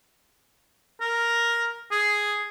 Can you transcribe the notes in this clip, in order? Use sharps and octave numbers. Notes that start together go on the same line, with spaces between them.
A#4
G#4